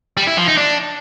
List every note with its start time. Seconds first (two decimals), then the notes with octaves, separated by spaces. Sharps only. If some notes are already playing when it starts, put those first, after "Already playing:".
0.17 G3
0.27 E4
0.37 F3
0.48 D#4
0.58 D4